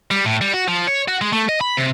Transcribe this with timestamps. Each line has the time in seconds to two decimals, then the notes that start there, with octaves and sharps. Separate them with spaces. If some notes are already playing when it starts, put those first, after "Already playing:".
0.11 G3
0.25 A2
0.42 G3
0.54 F#4
0.68 F3
0.88 C#5
1.08 F#4
1.21 G#3
1.33 A3
1.49 D#5
1.61 B5
1.77 C3